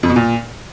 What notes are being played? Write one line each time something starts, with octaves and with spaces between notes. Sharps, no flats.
F2
B2
A#2